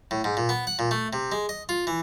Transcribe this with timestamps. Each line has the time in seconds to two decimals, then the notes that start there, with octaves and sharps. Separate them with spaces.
0.11 A2
0.24 G#2
0.37 A#2
0.49 B3
0.67 F#5
0.79 A#2
0.91 A3
1.13 C3
1.32 G#3
1.49 D#5
1.69 F4
1.87 E3